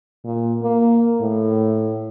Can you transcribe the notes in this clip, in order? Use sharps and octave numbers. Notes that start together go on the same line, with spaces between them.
A#2
A#3
A2